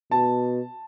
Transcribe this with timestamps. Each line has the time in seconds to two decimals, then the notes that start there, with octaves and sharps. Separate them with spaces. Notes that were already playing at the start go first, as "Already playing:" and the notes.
0.11 B2 A5